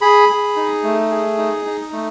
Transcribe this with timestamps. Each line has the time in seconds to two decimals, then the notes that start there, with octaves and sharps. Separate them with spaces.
0.01 G#4 B5
0.29 G#4
0.56 D#4
0.83 A3
1.11 G#4
1.38 D#4
1.65 D#4
1.93 A3